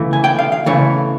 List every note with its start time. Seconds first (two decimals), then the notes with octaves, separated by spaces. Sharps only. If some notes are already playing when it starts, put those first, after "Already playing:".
Already playing: C#3 E3 A3
0.13 G#5
0.24 G5
0.39 F5
0.52 F5
0.66 C#3 E3 A3 C#5